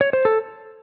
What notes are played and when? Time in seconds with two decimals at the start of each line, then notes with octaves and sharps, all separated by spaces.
0.01 C#5
0.13 C5
0.25 A4